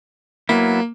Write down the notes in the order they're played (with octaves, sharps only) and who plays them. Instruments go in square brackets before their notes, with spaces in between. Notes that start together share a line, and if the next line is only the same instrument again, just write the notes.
[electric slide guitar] F#3 B3 E4 [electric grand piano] A#3